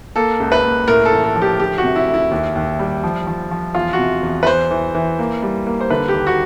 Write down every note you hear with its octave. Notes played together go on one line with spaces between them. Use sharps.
A#3 A4
C#2
B4
A#3
A2 A#4
A4
A1
A4
F3
G4
D2 G4
F#4
C3
E4
D2
E4
D#2
D#2
G3
F3
F3
F3
E2 F4
F#4
C3
E2
B4
E2 C5
E3
E3
A#3
G3
A#3
C5
D3 B4
G4
D#2
F#4